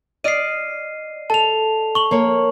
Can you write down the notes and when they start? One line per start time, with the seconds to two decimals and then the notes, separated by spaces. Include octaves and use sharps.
0.24 D5 D#5 F6 C7 D#7
1.30 A4 A5 F7
1.95 C#6 F#7
2.11 A#3 C#5